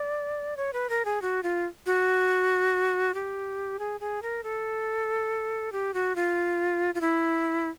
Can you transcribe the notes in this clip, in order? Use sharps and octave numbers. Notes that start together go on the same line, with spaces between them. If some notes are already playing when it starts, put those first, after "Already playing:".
Already playing: D5
C#5
B4
A#4
G#4
F#4
F4
F#4
G4
G#4
G#4
A#4
A4
G4
F#4
F4
F4
E4